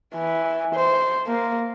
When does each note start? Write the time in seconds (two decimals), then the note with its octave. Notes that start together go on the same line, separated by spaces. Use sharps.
0.15 E3
0.75 C5
1.27 A#3